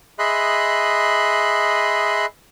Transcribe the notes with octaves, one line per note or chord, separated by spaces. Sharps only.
G#4 D#5 E5 B5 C6 F#6